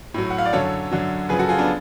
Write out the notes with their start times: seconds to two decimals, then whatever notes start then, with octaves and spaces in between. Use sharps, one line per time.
0.14 A2 F#3
0.30 F#5
0.38 F5
0.45 D5
0.53 F#2 D3 F#3 A4 C#5
0.91 F#2 D3 F#3
1.29 F#2 C#3 F3 G#4 B4
1.39 F#4 A4
1.49 F4 G#4
1.58 B3 D4